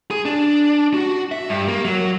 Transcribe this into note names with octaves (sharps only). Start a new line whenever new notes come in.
G#4
D4
F#4
E5
G2
A#3
F#3